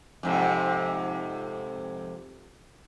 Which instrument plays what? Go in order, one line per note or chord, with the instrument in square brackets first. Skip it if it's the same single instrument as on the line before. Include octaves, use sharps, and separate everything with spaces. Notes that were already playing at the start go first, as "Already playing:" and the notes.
[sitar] F2 G#2 C3